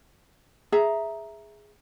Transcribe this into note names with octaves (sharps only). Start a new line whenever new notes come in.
G#4 E5 A#5